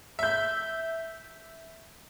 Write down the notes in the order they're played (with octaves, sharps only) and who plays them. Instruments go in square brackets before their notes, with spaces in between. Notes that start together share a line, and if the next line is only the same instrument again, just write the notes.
[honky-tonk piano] E5 G6